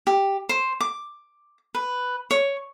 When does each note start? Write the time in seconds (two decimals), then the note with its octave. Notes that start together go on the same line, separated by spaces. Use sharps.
0.07 G4
0.49 C5
0.81 D6
1.75 B4
2.31 C#5